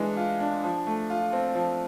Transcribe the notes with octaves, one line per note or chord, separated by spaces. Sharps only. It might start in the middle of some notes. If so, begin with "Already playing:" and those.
Already playing: E3 G#3 D4
F4
D4
F3
A3
F4
C4
F3